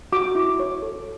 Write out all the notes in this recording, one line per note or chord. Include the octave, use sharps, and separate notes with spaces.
F#4 D6
E4
C#5
A4